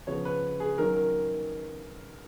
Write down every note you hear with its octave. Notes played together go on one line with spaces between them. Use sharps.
C#3 F3 B3 C#5
B4
G#4
D#3 F#3 C#4 A#4
A#4